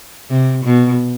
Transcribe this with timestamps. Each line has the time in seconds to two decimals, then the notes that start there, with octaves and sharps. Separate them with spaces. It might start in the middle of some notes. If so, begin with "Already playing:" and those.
0.29 C3
0.65 B2